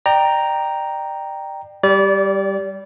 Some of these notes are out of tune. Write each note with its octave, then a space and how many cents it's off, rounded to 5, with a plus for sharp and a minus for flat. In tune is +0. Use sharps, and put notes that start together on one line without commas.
D5 +35 G5 +0 A#5 +0
G3 +0 D5 -30